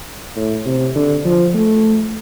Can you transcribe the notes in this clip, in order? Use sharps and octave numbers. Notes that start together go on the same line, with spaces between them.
A2
C3
D3
F3
A3